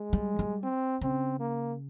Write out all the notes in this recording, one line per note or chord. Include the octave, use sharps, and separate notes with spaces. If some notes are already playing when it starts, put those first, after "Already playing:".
Already playing: G#3
G3
G3
C4
C#3 C4
A#3